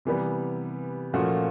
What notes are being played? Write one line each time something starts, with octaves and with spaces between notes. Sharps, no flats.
C3 E3 G3 B3
A#2 F3 A3 C#4 F#4